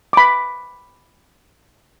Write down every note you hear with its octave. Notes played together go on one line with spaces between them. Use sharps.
B5 D6